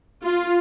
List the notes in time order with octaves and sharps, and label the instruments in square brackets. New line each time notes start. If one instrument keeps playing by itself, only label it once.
[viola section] F4